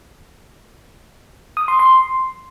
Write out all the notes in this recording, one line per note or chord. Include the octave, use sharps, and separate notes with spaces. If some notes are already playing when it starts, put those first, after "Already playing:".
D#6
C6
C6